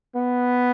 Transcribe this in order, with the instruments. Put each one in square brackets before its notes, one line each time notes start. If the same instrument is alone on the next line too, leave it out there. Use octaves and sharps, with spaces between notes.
[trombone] B3